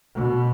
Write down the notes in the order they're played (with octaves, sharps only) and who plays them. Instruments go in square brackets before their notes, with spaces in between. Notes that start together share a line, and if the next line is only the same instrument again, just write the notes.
[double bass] B2